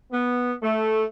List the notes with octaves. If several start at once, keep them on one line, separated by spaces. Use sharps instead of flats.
B3
A3